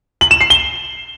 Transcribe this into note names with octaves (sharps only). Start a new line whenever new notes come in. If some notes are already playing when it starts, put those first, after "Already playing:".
F#7
E7
C7
G7